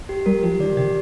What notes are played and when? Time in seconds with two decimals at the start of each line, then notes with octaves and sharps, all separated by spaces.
0.09 G4
0.26 G3 A#4
0.43 F3 G4
0.59 D#3 D5
0.77 C3 G4